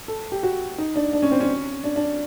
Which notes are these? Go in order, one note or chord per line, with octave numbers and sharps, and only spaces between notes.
A4
G4
F#4
D#4
D4
D4
C#4
C4
C#4
D4
D4